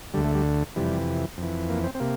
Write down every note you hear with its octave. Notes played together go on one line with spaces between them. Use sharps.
D2 D3 G3
A3
G3
F2 C3 E3 G3
F2 E3
A#3
C4
C4
C3 A#3